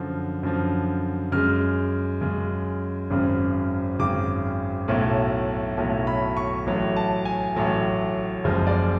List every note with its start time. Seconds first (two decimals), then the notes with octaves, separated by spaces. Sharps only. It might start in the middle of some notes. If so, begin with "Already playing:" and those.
Already playing: F#2 D3 F3
0.43 F#2 D3 F3
1.32 F#2 C#3 G#3 F6
2.21 F#2 C#3 G#3
3.10 G#1 F#2 C#3
3.99 G#1 F#2 C#3 D6
4.88 B1 A2 F#3 A3
5.77 B1 A2 F#3 A3 A5
6.07 B5
6.37 C#6
6.66 A1 A2 F#3 A3
6.96 A5
7.25 G#5
7.55 A1 A2 F#3 A3
8.44 F#1 F#2 F3 G#3
8.67 D5